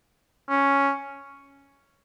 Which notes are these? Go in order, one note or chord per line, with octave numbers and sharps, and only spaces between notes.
C#4